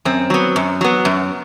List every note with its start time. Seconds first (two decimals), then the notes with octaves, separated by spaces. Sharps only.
0.05 F#2 C4
0.30 F#3 B3
0.56 F#2
0.81 F#3 B3
1.05 F#2